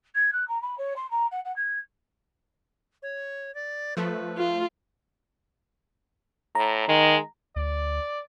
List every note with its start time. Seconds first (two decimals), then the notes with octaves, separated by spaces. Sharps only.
0.15 G#6
0.32 F#6
0.48 A#5
0.62 B5
0.78 C#5
0.96 C6
1.10 A#5
1.31 F#5
1.45 F#5
1.56 G#6
3.02 C#5
3.55 D5
3.97 F3 A3 B4
4.37 F4
6.55 A2 A#5
6.89 D#3 G#3
7.56 D2 D5